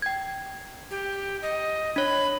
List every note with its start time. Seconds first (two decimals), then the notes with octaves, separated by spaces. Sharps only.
0.02 G5 G#6
0.91 G4
1.42 D#5
1.96 D4 C#5 B5